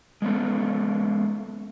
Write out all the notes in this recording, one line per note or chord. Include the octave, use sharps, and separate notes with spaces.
G#3 A#3 B3 C#4 A4